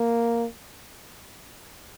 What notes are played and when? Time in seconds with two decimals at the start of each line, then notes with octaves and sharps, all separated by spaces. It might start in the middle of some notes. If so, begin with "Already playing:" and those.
Already playing: A#3